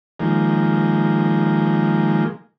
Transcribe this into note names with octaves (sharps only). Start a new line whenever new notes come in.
D#3 F3 G#3 A#3